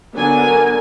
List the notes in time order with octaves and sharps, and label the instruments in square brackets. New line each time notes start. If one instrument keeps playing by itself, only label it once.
[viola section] D3 F#3 B3 D4 A#4 G#5